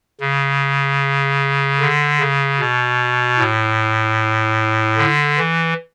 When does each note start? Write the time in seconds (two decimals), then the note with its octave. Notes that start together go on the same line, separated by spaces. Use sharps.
0.21 C#3
1.80 D3
2.20 C#3
2.60 B2
3.38 A2
4.97 D3
5.38 E3